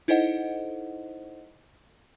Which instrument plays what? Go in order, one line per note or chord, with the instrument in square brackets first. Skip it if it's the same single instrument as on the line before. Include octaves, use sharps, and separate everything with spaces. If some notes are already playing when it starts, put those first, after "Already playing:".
[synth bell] D#4 E4 A4 C5 D#5 F#5